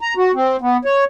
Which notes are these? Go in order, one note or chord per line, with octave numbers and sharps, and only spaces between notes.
A#5
F#4
C4
B3
C#5